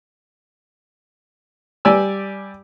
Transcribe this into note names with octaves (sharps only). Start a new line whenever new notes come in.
G3 G4 D5 G#5 E6